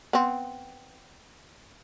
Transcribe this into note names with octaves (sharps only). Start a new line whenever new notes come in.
B3 C4